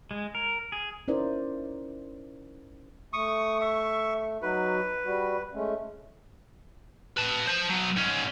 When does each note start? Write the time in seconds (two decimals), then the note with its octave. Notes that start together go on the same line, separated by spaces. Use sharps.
0.11 G#3
0.35 A#4
0.72 G#4
1.08 C#4 D#4 E4 A#4 C5 D5
3.13 A3 C#6 D#6
3.61 E5 C#6
4.42 F#3 D#4 F#4 B4
5.05 G3 F#4
5.53 G#3 A3 C#4
7.17 B4 A5
7.47 C5 A5
7.69 F#3 B3
7.96 G#2 C#4